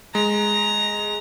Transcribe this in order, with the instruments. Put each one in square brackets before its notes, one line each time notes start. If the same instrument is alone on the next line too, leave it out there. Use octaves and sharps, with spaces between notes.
[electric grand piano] G#3 [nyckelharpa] A#5